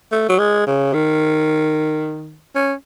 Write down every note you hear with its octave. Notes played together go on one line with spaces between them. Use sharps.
A3
F#3
G#3
C#3
D#3
C#4